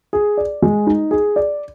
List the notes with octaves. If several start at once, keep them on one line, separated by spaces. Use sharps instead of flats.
G#4
D5
G#3
D#4
G#4
D5